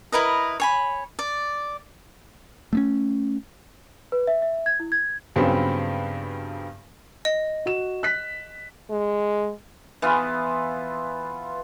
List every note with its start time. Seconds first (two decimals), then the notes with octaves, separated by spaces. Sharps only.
0.12 E4 A#4 B4 D#5
0.60 C#5 G#5 B5
1.19 D5
2.73 A3 B3 C#4
4.12 B4
4.27 E5
4.42 E5
4.66 G#6
4.80 E4
4.92 G#6
5.36 G2 C#3 F#3 B3 C4
7.25 D#5
7.66 F#4 E7
8.03 F#6 B6
8.90 G#3
10.02 E3 B3 F4